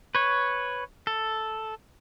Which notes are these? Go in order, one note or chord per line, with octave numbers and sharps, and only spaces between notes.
B4 C#5
A4